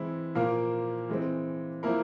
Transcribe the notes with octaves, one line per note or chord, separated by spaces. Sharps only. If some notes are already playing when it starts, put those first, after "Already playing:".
Already playing: E3 G#3 C4 E4
A#2 F3 A#3 F4 A#4
E3 G#3 C4
F3 A#3 E4 A#4